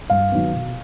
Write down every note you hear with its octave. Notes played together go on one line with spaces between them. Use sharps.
G2 F5
D#3 F#3 B3
B2